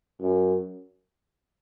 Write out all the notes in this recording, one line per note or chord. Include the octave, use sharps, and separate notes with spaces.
F#2